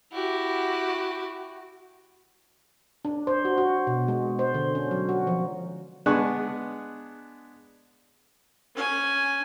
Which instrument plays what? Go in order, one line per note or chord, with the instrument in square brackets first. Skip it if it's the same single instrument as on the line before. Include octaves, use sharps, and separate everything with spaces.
[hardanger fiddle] E4 G4 [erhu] F#4
[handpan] D4
C5
F#4
F#4
B2
G#3
C5
D3
C#4
F#3
F#4
F3
[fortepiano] G#3 B3 D4 G#4 C#6 F#6
[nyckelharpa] C#4 G#5